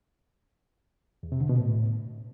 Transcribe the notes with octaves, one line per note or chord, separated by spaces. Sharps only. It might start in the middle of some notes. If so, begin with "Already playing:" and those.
E2
C3
D3
B2
A2